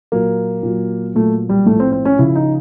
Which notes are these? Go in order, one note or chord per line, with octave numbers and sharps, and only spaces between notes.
A#2 F#3 A#3
A#2 F#3
A#2 F#3 A3
G3
A2 F3 A3
C4
C4
C#4
C#3 F3 E4
D#4